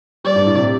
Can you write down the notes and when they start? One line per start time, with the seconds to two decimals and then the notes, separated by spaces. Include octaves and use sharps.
0.24 G3 D5
0.35 G2
0.46 A2
0.56 C3